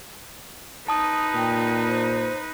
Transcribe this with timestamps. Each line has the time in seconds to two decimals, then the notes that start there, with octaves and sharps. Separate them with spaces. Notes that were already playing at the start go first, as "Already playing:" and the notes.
0.88 D#4 B4 A5 D#6
1.35 A#2 G5
1.88 C5